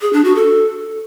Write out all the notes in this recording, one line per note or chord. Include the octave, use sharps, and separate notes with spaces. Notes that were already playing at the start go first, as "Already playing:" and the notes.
G#4
D4
F#4
A4